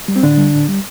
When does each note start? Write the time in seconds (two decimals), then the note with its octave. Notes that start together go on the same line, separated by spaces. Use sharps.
0.08 G3
0.16 C4
0.23 A2 D3 D4
0.37 G3
0.54 A2
0.68 G3